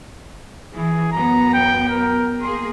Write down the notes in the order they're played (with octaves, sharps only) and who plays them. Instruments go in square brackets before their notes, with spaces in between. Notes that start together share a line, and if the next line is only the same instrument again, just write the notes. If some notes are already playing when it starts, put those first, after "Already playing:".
[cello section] E3 [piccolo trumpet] G#4
[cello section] F#2 B3 [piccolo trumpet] A#5
[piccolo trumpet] G5
A#4
[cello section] A#3 G#4 [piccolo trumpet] C6